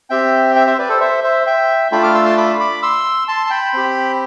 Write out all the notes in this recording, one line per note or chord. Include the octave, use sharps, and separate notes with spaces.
C4 G4 E5 G5
E5 G5
C5 E5
B4 D5
A4 C5
C5 E5
C5 E5
E5 G5
A3 D4 F4 G5 B5
D6 F6
C6 E6
A5 C6
B5 D6
B5 D6
C6 E6
A5 C6
A5
G5 B5
C4 G4